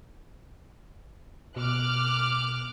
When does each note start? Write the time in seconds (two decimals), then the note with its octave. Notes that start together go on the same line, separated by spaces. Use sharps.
1.56 B2 D6 F6 F#6